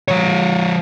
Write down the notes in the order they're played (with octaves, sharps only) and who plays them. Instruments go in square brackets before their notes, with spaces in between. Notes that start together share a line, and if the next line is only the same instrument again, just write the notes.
[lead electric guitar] F3 C#5